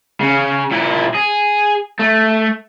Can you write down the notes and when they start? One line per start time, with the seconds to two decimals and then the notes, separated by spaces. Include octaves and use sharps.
0.21 C#3
0.72 A#2 E4
1.15 G#4
1.99 A3